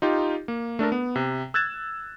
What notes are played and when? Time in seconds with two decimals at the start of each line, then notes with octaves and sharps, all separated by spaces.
0.02 D#4 F4 G4
0.48 A#3
0.79 A3 D4 A4 A#4
0.92 B3
1.16 C3
1.54 E6 F#6 G#6 A6 E7